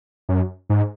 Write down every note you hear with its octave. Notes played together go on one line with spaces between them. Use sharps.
F#2
G#2